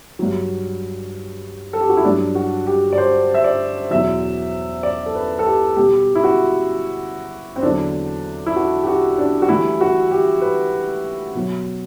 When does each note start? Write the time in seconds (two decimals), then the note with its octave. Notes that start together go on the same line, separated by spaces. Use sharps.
0.19 G2 F#3
1.73 A4
1.81 G4
1.89 F#4
1.97 E4
2.05 G2 F#3 D4
2.35 F#4
2.67 G4
2.93 D5
2.98 C5
3.34 E5
3.44 D5
3.90 E2 B2 F#3 E5
4.83 D5
5.06 A4
5.15 B4
5.39 A4
5.46 G4
5.76 B2 G3 G4
6.15 E4
6.24 F#4
7.56 C4
7.62 E2 D3 F#3 D4
8.46 E4
8.56 F#4
8.83 G4
8.87 F#4
9.18 D4
9.42 F#4
9.48 A2 E3 G3 E4
9.81 F#4
10.11 G4
10.42 B4
11.35 B2 F#3